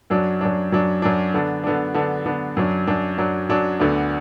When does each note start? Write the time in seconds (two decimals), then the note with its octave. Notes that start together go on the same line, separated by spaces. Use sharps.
0.10 F#2 F#3 D4
0.41 F#2 F#3 D4
0.72 F#2 F#3 D4
1.02 F#2 F#3 D4
1.34 D3 B3 D4
1.64 D3 B3 D4
1.94 D3 B3 D4
2.26 D3 B3 D4
2.57 F#2 F#3 D4
2.87 F#2 F#3 D4
3.18 F#2 F#3 D4
3.49 F#2 F#3 D4
3.79 D2 D3 B3 D4